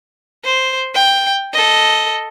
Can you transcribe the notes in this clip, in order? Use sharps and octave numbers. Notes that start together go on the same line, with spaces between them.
C5
G5
A4 D#5